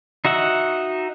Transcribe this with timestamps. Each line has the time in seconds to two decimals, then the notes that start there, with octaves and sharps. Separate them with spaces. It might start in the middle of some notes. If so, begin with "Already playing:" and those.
0.25 D#4 F#4 E5 F#5